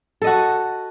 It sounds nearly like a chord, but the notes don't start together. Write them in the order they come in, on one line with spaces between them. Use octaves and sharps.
A4 D#5 F#4